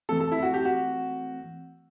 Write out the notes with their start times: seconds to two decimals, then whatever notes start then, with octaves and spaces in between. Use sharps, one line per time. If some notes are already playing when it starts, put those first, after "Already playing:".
0.09 E3 A3 C4 A4
0.20 A4
0.32 E4
0.42 F#4
0.54 G4
0.65 F#4